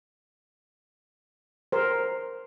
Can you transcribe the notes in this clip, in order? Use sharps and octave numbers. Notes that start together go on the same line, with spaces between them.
A#4 C5